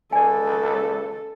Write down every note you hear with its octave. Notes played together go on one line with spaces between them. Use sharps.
C#2 A4 D5 G#5